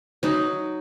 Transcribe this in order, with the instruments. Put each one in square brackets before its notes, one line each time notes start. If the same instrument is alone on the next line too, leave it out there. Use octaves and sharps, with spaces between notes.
[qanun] F#3 D#4